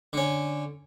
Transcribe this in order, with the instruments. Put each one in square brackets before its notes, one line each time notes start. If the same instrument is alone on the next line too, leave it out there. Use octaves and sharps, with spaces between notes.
[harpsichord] D3 C#4